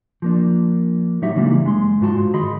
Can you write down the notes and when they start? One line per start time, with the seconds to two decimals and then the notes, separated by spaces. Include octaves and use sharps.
0.22 F3 A#3 D4
1.22 A2 F#3 D#4 F#4 G4 E5
1.35 C#3 E3 G3 G#3 A#3 D4
1.64 F#2 G#3 C6
2.01 G#2 D4 F4 F#4 A5 C6
2.34 D#3 G#4 D#5 B5 C6